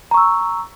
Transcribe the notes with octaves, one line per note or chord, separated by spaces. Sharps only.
A#5 C#6 E6